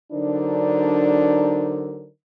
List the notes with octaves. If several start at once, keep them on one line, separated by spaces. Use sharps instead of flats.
D3 F#3 D4 D#4 A#4 C5